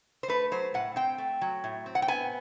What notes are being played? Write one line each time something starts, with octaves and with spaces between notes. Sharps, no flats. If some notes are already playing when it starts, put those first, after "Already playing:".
C5
A3 B4
F#3 C5
A2 F#5
C4 G5
A3
F#3
A2
C4
F#5
G5
B3 G#5